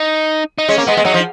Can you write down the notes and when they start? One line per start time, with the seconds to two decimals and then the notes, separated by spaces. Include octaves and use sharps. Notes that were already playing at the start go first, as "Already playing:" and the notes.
Already playing: D#4
0.58 D#4
0.69 G#3 C#4
0.78 A#3
0.87 G#3 B3
0.97 G#3
1.05 F#3 D#4
1.14 F3